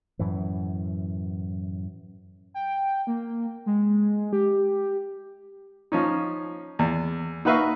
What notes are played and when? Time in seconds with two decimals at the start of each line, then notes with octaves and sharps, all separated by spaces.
0.19 F#2 A2 E3
2.54 G5
3.07 A#3
3.66 G#3
4.33 G4
5.92 F3 C#4 D#4
6.79 E2
7.45 D#4 F#4 B4 E5 F5 C#6